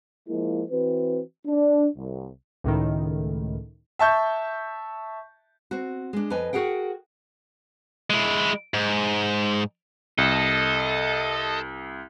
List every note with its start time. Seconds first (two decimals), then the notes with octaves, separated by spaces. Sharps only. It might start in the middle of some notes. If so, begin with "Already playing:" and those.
0.28 F3 G#3 A#3 E4
0.71 E3 C4 F#4 B4
1.46 D4
1.97 C2
2.64 C#2 A2 D#3
3.99 E5 A5 C#6 G6
5.71 C4 F#4
6.13 G#3 D4
6.30 F2 B4 D#5 G#5
6.53 F#4 G#4 A#4 F#5 G5
8.10 G#3 E4
8.74 G#2
10.18 C2 A4 D#5